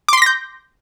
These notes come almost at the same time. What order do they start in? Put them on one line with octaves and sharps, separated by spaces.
D6 C6 B6 A#6 G6